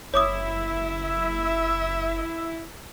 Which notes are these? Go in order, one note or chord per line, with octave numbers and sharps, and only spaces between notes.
F#1 E4 C#5 E5 D6 D#6